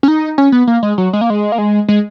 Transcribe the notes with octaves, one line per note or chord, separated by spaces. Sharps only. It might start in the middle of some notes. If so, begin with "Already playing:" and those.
C#4
D#4
C#4
B3
A#3
G#3
F#3
G#3
A#3
G#3
A#3
G#3
G#3